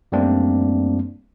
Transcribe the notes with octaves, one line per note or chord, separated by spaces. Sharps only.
F#2 G3 A3 A#3 C4 D4